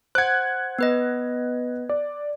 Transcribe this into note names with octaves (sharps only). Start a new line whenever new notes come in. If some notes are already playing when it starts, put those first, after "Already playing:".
C5 F#5 F#6 G#6
B3 B4 D#5
D5